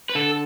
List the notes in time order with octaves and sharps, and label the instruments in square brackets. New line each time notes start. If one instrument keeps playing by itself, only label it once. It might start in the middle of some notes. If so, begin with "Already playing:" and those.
[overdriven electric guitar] B4
[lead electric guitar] D3 [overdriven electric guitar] A4